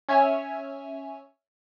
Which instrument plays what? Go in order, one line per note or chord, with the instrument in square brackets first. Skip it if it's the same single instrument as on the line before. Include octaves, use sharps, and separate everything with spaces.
[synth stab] C#4 C#5 E5 G#5